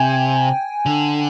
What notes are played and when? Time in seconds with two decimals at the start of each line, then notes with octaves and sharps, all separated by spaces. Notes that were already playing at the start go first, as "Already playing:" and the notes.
Already playing: C3 G5 G#5
0.86 D3